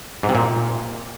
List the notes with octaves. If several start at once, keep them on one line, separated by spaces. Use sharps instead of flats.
G#2
C3
A#2